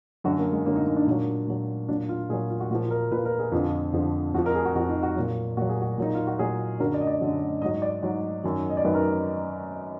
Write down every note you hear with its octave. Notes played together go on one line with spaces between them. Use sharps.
F#2 D3 F#3 F#4
A#3
G#3
F#2 D3 F#3 A#3
D#4
D#4
D4
A#2 F#3
A#2 F#3
A#2 F#3 D4
F4
A#2 F#3 G#4
F4
F#4
A#2 F3 F#4
A#4
A#2 F3 B4
A#4
G#4
F2 D3 F3
F2 D3 F3
F2 F3 F#4
A#4
G#4
F#4
F2 F3 F#4
D#4
F#4
A#2 F#3
A#2 F#3 F#4
G#4
F#4
A#2 F#3 D#4
F4
F#4
A#2 F#3 G#4
F#2 D3 F#3 A#4
D5
D#5
D5
F#2 D3 F#3
G#2 F#3 D#5
D5
G#2 F#3
F#2 D#3 F#3
D#5
D5
F#2 D#3 F#3 B4
A#4